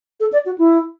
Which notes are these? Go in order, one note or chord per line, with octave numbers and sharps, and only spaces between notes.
A4
D5
F#4
E4